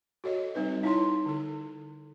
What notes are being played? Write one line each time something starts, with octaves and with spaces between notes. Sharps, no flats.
F#4 A4 C#5 D#5
G3 C4 D#4 B4
D#4 E4 C#5 A5 C6
D3 A4